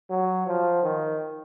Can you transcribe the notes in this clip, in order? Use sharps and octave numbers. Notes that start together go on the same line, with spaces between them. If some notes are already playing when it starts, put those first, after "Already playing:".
F#3
F3
D#3